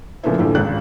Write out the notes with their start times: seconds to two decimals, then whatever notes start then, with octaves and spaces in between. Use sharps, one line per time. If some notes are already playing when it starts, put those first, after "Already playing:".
0.23 A#2 C#3 F3 A3 B3 E4
0.38 A#1 A2 D3 E3 F3
0.55 G#1 C#2 F#6